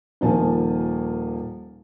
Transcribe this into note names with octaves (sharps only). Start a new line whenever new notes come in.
D#1 D#3 F3 A#3 G#5 A5